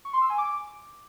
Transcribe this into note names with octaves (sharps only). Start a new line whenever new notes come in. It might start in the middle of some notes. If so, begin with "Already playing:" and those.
C#6
C6
E6
G#5
D6